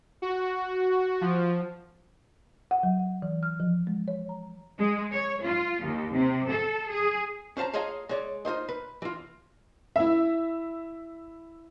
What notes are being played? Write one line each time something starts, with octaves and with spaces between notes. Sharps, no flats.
F#4
F3
F#5
F#3
F#5
E3
F6
F3
G#3
C#5
A#5
G#3
C#5
F4
D#2
C3
A4
G#4
C#4 C5 F5 A5 A#5
F4 G#4 C#5 D#5 F5 A#5
G#3 C#5 D5
D#4 F4 C5 D#5
B4
E3 F4
E4 E5